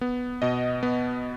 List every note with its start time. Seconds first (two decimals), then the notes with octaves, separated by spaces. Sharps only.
0.01 B3
0.42 B2 D#5
0.83 B3